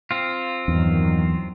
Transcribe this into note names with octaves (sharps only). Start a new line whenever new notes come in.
C4 F4
E2 G2 D#3 F#3